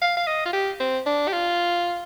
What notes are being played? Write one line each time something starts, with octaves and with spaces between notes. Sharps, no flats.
F5
F5
D#5
F4
G4
C4
D4
G4
F4